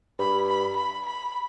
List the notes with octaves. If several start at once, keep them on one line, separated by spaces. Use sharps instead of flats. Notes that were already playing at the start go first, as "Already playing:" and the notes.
G2 B5
B5
B5
B5